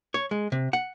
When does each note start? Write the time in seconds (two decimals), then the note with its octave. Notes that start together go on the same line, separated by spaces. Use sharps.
0.14 C#5
0.31 G#3
0.52 C3
0.73 F#5